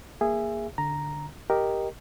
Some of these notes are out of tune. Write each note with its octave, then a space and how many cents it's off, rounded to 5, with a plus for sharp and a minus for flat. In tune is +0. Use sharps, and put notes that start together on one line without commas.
A#3 +0 G#4 -10 E5 +20
D3 +0 A#5 +0
G4 +0 A#4 +0 D#5 +0